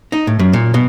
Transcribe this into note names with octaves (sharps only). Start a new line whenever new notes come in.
D#4
A2
F#2
A#2
B2